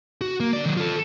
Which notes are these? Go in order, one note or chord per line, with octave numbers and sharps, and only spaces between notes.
F#4
A#3
D3 D5
D#3 F#3
F4 A4